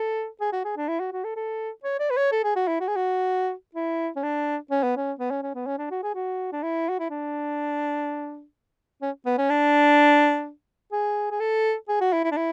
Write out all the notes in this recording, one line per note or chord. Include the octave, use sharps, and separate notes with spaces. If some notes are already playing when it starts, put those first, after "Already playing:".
Already playing: A4
G#4
F#4
G#4
D4
E4
F#4
F#4
A4
A4
C#5
D5
B4
C#5
A4
G#4
F#4
E4
F#4
G#4
F#4
E4
C#4
D4
C#4
B3
C#4
B3
C#4
C#4
B3
C#4
D4
F#4
G#4
F#4
D4
E4
F#4
E4
D4
C#4
B3
C#4
D4
G#4
G#4
A4
G#4
F#4
E4
E4
D4
E4